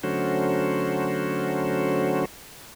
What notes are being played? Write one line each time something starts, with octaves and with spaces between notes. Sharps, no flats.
D3 F#3 A3 C#4 F#4 C5